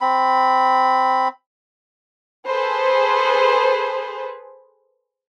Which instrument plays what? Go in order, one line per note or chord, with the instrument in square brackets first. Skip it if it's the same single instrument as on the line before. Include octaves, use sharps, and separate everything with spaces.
[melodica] C4 B5
[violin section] G#4 A4 B4 C5